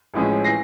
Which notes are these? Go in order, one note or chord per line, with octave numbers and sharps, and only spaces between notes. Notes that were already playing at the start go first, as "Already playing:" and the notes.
A1 A2 F3 G#3 C#4
E3 A#6 C7